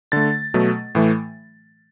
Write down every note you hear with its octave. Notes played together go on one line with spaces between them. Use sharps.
D3 A3 A6
B2 F#3 A3
A2 E3 A3